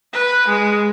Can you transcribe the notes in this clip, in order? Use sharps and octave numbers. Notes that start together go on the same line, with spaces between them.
B4
G#3